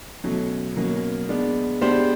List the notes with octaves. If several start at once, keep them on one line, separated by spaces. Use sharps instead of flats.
B2 F#3 A3 C#4
B2 F#3 A#3 C#4
G#3 B3 D4
G#3 B3 D4 G4 C5